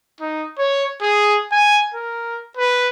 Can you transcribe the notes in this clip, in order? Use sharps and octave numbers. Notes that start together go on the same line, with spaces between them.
D#4
C#5
G#4
G#5
A#4
B4